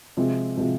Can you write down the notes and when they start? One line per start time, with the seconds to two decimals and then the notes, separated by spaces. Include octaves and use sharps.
0.17 C3 F3 G#3 C4
0.58 C3 F3 G#3 C4